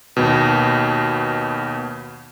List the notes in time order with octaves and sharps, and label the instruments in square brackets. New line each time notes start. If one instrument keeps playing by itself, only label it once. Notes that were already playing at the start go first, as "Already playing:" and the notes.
[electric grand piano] D#2 B2